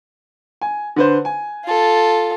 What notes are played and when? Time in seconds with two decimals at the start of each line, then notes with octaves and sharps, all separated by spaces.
0.61 G#5
0.96 D3 B4 C5
1.25 G#5
1.65 F4 A4